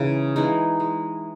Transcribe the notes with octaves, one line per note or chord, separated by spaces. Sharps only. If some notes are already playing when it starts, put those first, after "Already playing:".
Already playing: C#3 E3 G#3 D#4
E3 G#3 D#4
G#3